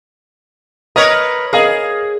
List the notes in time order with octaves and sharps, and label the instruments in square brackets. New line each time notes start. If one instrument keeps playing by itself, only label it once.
[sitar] A#4 B4 C#5 [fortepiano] D#5
[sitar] G#4 [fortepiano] A#4 D#5 F5